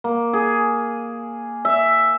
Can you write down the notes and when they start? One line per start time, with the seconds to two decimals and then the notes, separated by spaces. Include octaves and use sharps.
0.04 A#3
0.33 G#4
1.65 E5